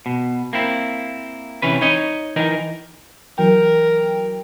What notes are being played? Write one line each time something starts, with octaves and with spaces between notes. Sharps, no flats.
B2
A#3 C4 E4
C3 E3 C#4 B4
D#4 C#5 D#5
E3 D#4 A#4
E3 F#3 A#4 G5